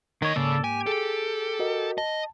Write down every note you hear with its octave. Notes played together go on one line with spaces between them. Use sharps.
D#2 D#3 C#5 D#5
G#2 C#3 A#3 A4 D5
G4 G#5
G#4 A4
F#4 A#4 D#5
D#5 A5